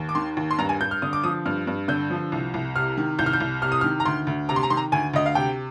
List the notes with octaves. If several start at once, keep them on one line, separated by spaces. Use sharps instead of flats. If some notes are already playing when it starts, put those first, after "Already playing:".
Already playing: D#2
D6
D#3 C6
D#2
C6
G2 A#5
G#5
G2 G6
F6
D3 D#6
D6
F3 D#6
G2 F6
G2
D3 G6
F3
C2
C2
C3 F6
D#3
C2 G6
F6
G6
C2
C3 F6
D#6
F6
D#3
A#5
D2 C6
D2
C3 A#5
C6
A#5
D#3 C6
A#5
D2 G#5
D2 D#5
F5
C3 G5